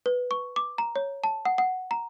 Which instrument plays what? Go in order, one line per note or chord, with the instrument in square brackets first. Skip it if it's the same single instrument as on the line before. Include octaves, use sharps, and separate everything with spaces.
[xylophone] B4
C#6
D6
A#5
C#5
A5
F#5
F#5
A#5